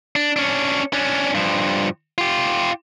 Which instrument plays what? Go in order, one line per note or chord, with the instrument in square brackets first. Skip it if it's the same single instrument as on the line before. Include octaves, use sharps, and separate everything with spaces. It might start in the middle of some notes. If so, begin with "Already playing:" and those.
[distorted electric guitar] D4
C#4 D4
C#4 D4
G2 F3
F4 G4